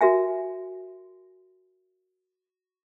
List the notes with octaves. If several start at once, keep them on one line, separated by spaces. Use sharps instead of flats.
F#4 A#4 E5 G#5